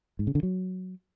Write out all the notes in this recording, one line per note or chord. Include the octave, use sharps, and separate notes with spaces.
G#2
C#3
D3
F#3